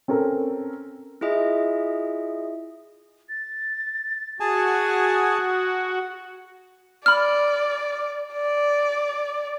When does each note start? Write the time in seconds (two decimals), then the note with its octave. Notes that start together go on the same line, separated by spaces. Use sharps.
0.08 C4 C#4 A4 A#4
1.21 E4 F4 G#4 D#5 E5
3.29 A6
4.40 F#4 G#4 G#5 A5 D#6
7.06 D5 B5 F6
8.34 D5